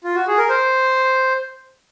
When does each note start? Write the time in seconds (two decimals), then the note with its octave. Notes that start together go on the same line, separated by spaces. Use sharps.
0.04 F4
0.15 F#4
0.28 G#4
0.38 A#4
0.50 C5